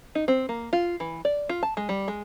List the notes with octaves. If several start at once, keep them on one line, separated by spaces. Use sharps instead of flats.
D#4
C4
A#3
F4
E3
D5
F4
A5
G#3
G3
G#3